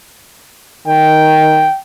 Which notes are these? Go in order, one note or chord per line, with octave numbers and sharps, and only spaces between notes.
D#3 G5